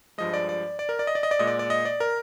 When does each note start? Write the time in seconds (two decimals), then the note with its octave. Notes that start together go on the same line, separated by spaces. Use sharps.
0.18 G2 F3 G#3 D#5
0.34 D5
0.49 D5
0.79 D5
0.89 A#4
0.99 D5
1.07 D#5
1.15 D5
1.23 D#5
1.31 D5
1.39 A#2 G#3 D#5
1.47 D5
1.59 D5
1.70 D#5
1.85 D5
2.00 A#4